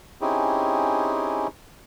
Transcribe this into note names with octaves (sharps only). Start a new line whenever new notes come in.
C4 C#4 D#4 E4 G4 G#4